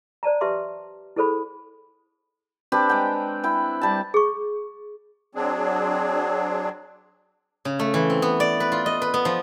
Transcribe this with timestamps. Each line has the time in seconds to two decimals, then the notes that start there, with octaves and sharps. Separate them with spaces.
0.23 C5 D5 A5 A#5
0.41 G4 B4 E5 A5 C6 D6
1.16 E4 G#4 A4 C5 B5
2.72 C4 D4 G4 B4
2.89 G#3 G5
3.44 E4 G5
3.82 G3 A5
4.14 G#4 C#6
5.35 F#3 C4 D4 G#4
7.65 C#3
7.79 A3
7.94 E3
8.10 C4
8.22 B3
8.40 D5
8.60 B4
8.72 F4
8.86 D#5
9.02 B4
9.14 B3
9.25 F3